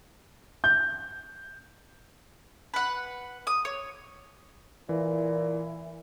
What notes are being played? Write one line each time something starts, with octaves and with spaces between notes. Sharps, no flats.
G6
B4 F#5
D#6
C#5
A#2 E3 E4